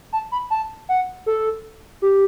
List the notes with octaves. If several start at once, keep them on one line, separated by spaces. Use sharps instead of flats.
A5
B5
A5
F#5
A4
G4